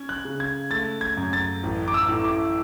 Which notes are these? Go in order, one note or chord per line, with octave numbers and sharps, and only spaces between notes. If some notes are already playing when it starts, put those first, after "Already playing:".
Already playing: C#4 G#6
F#6
C#3
G#6
A3 A6
G#6
F#2
A6
A1
D6
E6
A2
D6